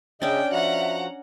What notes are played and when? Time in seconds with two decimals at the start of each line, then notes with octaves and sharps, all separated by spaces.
0.22 C#3 C#4 D4 D#5 E5 G5
0.51 F3 F#4 E5 F#5 A#5